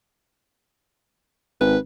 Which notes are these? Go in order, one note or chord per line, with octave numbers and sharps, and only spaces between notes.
G#1 B4